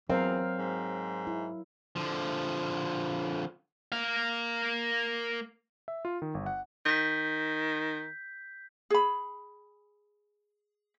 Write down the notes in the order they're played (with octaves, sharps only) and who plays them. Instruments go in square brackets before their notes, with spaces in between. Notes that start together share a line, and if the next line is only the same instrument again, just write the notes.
[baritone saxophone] E2 [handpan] F#3 A#4 F5 [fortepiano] C4
[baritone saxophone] G#2
[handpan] E4
[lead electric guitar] D3 F3
[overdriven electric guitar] A#3 F5
[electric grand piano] E5
F4
D#3
G1
F#5
[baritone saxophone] D#3 [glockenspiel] G6 B6
[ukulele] G#4 B5